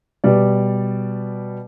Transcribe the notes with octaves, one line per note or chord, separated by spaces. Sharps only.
B2 G3 D5